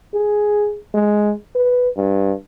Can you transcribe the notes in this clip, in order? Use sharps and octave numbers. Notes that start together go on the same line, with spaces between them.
G#4
G#3
B4
G2